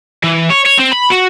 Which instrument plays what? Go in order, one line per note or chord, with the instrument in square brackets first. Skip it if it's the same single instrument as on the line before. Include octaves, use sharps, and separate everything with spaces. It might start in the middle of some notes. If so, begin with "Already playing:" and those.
[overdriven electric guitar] E3
C#5
C#5
C4
B5
F#4